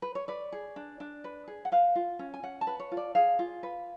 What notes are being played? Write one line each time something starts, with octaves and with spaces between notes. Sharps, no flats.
B4
C#5
B4 D5
G#4
D4
D4
B4
G#4
F#5
B4 F5
F4
C#4
G#5
C#4 F#5
A5
B4
C#5
F4
D5
G#4 F5
F4
B4